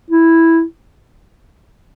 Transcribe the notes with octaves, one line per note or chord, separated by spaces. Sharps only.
E4